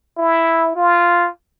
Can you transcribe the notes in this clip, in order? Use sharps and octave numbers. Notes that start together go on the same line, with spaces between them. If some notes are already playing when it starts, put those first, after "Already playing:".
E4
F4